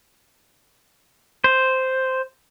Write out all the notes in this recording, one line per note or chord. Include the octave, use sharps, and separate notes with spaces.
C5